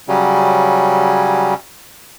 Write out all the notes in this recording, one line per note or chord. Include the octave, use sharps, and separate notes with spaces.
C#3 F#3 G3 C#4